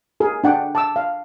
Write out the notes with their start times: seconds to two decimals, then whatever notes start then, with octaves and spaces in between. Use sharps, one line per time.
0.20 G#4 A#4
0.44 D4 F#5 G5 D6
0.75 A5 D6 E6
0.96 F5